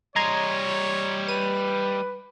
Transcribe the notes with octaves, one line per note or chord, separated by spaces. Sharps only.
G3 C#5 D#5 A#5 C6 G#6
B4 D#7